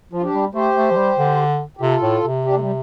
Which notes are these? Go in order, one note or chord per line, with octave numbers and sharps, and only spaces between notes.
F3 F4
D4 G4
G3
A3 G4 C5
A3
F3
G3
D3
G4
C3 F4 A4
A2
C3
D4 G4
A3
G3